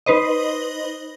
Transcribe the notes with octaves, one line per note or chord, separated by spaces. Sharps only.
D#4 B4 C5 D#5